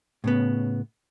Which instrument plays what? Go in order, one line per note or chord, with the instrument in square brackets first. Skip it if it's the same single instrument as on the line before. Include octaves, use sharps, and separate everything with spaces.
[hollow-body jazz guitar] A2 C#3 B3